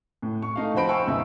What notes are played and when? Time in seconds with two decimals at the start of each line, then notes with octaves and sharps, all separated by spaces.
0.22 A2
0.42 C#6
0.56 A3 D#4 F5
0.75 F3 F#4 C5 B5 D7
0.89 F5 G5 G#5 C#6 E6
1.07 C#2 F#2 B2 D#4 E5 E6